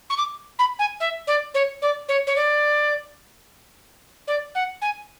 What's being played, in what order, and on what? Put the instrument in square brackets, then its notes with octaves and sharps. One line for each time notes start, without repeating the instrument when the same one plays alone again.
[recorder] C#6
D6
B5
G#5
E5
D5
C#5
D5
C#5
C#5
D5
D5
F#5
G#5